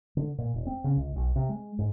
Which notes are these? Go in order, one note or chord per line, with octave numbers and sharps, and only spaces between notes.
D3
A#2
E1
C4
C#3
C#2
B1
C3
G#3
G#2